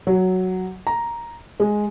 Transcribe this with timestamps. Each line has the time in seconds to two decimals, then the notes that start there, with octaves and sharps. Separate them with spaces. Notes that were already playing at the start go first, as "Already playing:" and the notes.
0.07 F#3
0.87 A#5
1.60 G#3